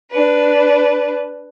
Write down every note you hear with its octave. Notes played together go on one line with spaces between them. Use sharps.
D4 B4